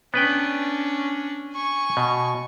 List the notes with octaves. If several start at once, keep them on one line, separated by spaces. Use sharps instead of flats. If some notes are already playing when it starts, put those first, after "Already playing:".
B3 C#4 D4 B4 G5
G#5 C#6
B2